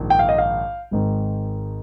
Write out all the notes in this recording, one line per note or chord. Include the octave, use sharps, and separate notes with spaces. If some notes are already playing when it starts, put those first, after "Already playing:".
Already playing: A#1 G#2 D#3
G5
F5
D#5
F5
G#1 G#2 D#3